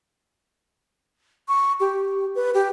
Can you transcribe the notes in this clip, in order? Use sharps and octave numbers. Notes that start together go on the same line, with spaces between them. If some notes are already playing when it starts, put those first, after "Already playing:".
C#6
G4
B4
G4